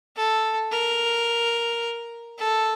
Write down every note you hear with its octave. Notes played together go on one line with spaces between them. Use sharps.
A4
A#4
A4